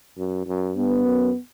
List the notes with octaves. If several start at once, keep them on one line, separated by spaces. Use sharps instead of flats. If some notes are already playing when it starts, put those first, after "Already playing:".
F#2
F#2
G2 B3
F#2